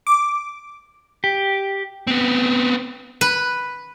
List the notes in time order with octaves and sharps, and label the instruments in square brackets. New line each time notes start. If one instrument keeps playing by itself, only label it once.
[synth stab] D6
[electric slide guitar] G4
[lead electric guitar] B3 C4
[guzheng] B4